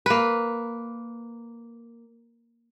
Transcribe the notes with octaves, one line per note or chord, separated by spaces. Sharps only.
A#3 B4